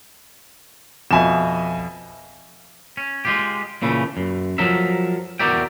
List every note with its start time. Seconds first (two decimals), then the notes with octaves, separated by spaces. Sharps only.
1.11 F2 B2 E5 G#5 E7
2.97 C#4
3.25 G#3 F4 G4
3.82 A#2 C#3 E3 A3
4.17 F#2
4.58 F3 F#3 A4 A#4 E5
5.39 E2 F#4 A#4 D5 E5 G5